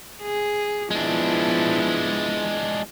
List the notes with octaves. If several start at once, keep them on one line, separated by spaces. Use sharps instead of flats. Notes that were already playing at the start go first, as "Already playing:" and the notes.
G#4
F3 G#3 B3 D4 E4